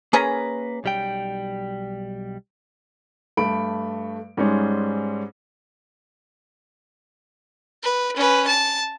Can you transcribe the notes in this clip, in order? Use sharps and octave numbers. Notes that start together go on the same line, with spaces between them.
A#3 C#4 G#4 A#4 B4 A#5
B1 G3 G5
G2 A3 B5 D7
G#2 G3 G#3 C#4
B4
C#4 B4
A5